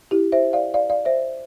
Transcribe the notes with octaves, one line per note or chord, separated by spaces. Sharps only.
E4 G4
C5 E5
D5 F5
D5 F5
D5 F5
C5 E5